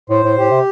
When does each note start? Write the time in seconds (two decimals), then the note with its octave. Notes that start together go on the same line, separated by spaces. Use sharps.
0.09 A2 C5
0.24 A2
0.37 A2 G4
0.51 C3